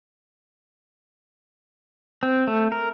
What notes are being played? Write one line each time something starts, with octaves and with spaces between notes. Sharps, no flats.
C4
A3
A#4